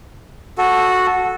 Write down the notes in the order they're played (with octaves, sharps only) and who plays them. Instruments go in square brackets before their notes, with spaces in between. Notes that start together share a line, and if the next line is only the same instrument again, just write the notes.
[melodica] F#4 A4